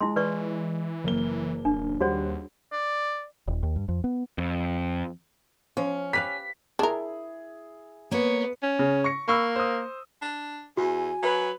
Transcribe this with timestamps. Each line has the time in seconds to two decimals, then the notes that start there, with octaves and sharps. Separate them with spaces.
0.01 G#3 E4 F4 C6
0.16 E3 B4 D5 C#6
1.04 F#1 A#3 G7
1.65 D#1 D4
2.00 D#2 G3 F#4 G#4 C5 C#5 F#5
2.72 D5
3.48 D#1
3.63 D#2
3.76 G2
3.88 F2
4.04 B3
4.38 F2
5.77 F3 C#4
6.13 G4 B4 F5 B6
6.79 D4 E4 G#4 A#4
8.11 A#3 B3 C#5
8.63 C#4
8.79 C#3
9.04 C#6 A#6 C#7
9.28 A#3 B5 C#6 E6
9.56 C5 D#6
10.22 D4
10.77 E2 F#4 G#5
11.23 F#3 B4